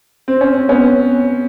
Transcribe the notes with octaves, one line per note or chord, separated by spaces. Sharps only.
C4
C#4
C4
B3 C#4